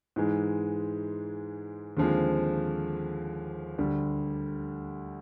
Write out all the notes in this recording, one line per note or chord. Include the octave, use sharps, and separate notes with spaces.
G#2 E3 G#3
D#2 D3 F3 G#3 C4
D2 D3 G3